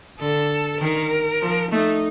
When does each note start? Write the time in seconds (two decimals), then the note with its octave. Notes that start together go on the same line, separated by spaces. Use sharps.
0.20 D3 A4
0.81 D#3 A#4
1.42 F3
1.72 A3 D#4